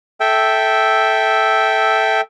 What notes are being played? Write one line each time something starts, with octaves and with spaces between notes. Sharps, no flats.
A4 E5 G5